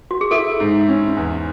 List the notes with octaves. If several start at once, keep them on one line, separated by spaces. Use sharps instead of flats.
F#4
G#4
E4 A4
G#2
C#4
E2